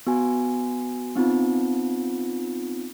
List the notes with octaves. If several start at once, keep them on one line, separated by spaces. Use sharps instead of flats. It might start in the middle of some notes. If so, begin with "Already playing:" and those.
B3 F#4 G#5
B3 C4 D#4 F4